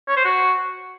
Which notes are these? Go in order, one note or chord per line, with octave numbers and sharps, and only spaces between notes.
C#5
C5
F#4